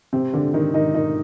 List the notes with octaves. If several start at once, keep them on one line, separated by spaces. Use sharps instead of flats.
C3 C4
D3 D4
D#3 D#4
D#3 D#4
D#3 D#4